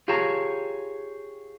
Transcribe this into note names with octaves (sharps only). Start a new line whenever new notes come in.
F4 G4 G#4 C#5 A5 A#5